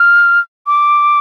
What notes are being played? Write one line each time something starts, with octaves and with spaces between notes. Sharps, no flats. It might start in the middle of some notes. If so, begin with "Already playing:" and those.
Already playing: F6
D6